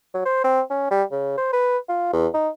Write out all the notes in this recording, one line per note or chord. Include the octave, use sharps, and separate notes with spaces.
F#3
C5
C4
C#4
G3
C#3
C5
B4
F4
E2
D#4